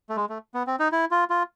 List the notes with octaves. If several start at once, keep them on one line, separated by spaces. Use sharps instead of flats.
A3
G#3
A3
B3
C4
D#4
E4
F4
F4